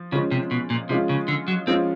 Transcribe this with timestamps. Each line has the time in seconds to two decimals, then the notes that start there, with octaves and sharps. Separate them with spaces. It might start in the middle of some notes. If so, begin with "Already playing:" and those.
Already playing: F3
0.12 C#3 F3 G#3 C#4 F4
0.31 C3
0.51 B2
0.70 A#2
0.89 C3 F3 G#3 C#4 F4
1.09 C#3
1.28 D3
1.48 F#3
1.67 F3 G#3 C4 C#4 F4